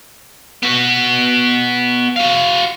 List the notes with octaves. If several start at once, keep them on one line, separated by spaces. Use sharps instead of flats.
B3 F#4
F#4 F5